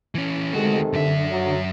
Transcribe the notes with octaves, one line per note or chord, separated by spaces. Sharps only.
E3 C#4
D2 C3 D#3 G#3 F#4 A4
F#2 D3 E5
F#3